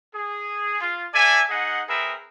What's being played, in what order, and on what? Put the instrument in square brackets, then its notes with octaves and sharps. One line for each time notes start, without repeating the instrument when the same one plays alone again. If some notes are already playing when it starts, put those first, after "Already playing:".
[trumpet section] G#4
F4
A4 D5 E5 G#5
D#4 G#4 D#5 F#5
C4 G#4 A#4 B4 E5